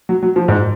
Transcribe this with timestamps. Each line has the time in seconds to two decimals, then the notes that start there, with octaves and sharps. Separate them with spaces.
0.09 F#3
0.23 F#3
0.36 F3
0.48 G#2